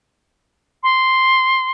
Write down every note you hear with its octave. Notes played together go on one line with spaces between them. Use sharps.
C6